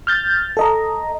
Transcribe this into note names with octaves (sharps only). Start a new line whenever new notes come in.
F6 G6 A6
A4 D#5 A#5